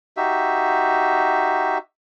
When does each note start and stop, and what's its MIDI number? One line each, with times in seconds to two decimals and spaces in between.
0.17 1.78 63
0.17 1.78 66
0.17 1.78 67
0.17 1.78 76